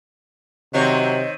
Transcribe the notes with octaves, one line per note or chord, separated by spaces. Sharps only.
C3 D#3 F#3 C4 C#5 D#5